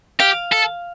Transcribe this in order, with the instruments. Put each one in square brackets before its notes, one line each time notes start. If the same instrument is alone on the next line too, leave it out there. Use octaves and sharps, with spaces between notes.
[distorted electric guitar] G4 [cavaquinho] F5
[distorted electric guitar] A4